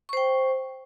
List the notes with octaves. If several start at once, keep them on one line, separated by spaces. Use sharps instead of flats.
C5 G5 C#6